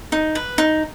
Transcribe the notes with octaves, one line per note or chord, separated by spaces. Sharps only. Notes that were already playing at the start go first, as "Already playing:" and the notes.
D#4
B4
D#4